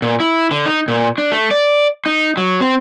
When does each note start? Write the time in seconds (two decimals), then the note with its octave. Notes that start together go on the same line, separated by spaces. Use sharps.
0.02 A#2
0.20 E4
0.51 D3
0.66 D#4
0.88 A#2
1.18 D4
1.32 A3
1.51 D5
2.06 D#4
2.37 F#3
2.61 C4